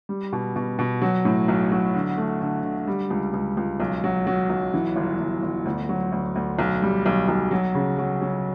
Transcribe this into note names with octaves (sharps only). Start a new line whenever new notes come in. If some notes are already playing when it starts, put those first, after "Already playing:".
G3
B2
B2
B2
F#3
A2
B1
F#3
D3
A3
D3
D3
G3
C#2
C#2
C#2
B1
F#3
F#3
B1
E3
G1
G1
G1
D2
F#3
D2
D2
B1
G3
B1
B1
F#3
C#3
F#3
F#3